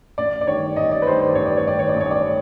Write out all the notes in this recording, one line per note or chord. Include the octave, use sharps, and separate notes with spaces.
A1 D5
D5
G2 D#3 C#5
A1 D#5
D5
B4
G2 D#3 C5
C5
A1 C#5
D5
C#5
G2 D#3 D5
C#5
A1 D5
C#5
D5
C#5